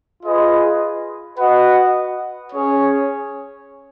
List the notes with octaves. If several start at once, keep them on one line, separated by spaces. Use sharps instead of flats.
F4 G#4 B4 D#5
F#4 B4 D#5 F#5
C#4 G#4 C#5